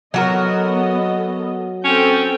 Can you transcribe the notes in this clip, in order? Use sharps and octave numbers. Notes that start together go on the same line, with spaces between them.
F#3 B3 F#4 A4 A#4 D#5
C4 C#4 A4 G5